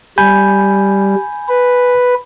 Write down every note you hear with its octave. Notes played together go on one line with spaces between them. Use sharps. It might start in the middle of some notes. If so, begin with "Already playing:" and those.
G3 G#5 B5 G6
B4